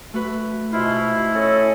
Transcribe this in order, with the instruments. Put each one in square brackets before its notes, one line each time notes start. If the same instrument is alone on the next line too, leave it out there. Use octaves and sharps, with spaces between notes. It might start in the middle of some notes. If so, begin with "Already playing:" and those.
[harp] A3 F#4 B4
[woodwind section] G#2 B2 F4 [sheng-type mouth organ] E4
[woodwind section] C#4 A4 D#5